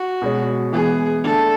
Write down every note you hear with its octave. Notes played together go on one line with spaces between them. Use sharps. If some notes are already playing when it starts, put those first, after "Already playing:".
Already playing: F#4
B2 G#3 C#4
E3 G#3 B3 E4 G#4
D3 A3 D4 A4